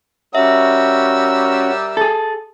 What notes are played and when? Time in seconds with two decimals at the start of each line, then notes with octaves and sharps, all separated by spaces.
0.35 G3 C#4 F#4 A#4 E5 E6
1.97 G#4 A4